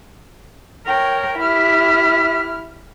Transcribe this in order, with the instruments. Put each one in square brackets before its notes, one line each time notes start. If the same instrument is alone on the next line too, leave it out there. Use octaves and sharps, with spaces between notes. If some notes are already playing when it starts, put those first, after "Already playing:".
[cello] A#4 [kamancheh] C#5 G5
[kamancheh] E4 F6 [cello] G4 E5